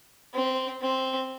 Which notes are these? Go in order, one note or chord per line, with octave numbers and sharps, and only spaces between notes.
C4
C4